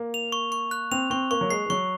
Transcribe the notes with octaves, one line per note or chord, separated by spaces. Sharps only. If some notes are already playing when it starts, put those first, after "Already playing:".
Already playing: A#3
F7
C#6
C#6
F#6
C4 F7
C4 C#6
A#3 C#6
F#3
G#3 C7
G#3
F#3 C#6